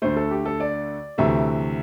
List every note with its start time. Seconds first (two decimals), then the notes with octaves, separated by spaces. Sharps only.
0.02 D2 D3 A3 C5
0.16 A4
0.31 G4
0.45 A4
0.60 D5
1.18 D2 C3 E3 A3 E5